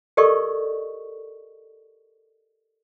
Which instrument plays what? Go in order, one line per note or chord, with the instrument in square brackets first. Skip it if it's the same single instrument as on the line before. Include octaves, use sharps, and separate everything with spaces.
[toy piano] G4 A4 A#4 D5 D#5 C#6